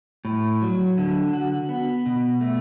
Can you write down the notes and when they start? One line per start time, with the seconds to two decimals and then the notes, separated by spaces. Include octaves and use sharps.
0.25 A2
0.62 F#3
0.98 D3
1.33 F#4
1.69 B3
2.06 B2
2.41 A3